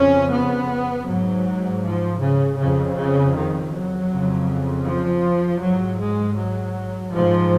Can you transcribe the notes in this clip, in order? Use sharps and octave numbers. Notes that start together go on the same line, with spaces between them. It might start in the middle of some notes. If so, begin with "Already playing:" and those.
Already playing: F2 C#3 C#4
B3
G#2 F#3
F3
C#3
F2 C#3
C#3
D#3
F#3
F2 C#3
F3
G#2 F#3
G#3
F#3
G#2 F3